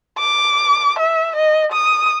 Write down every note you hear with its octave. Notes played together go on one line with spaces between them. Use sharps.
D6
E5
D#5
D#6